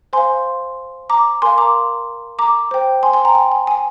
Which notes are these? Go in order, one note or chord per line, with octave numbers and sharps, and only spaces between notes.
C5 F5 G#5 C6
A#5 D6
A#4 F5 G#5 C6
A#5 D6
A#5 D6
C5 G5
G#5 C6
G#5 C6
G5 A#5
G#5
G#5
G#5